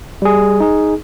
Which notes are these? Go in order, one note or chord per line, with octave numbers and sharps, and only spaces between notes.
G3 G#4
D#4 G#4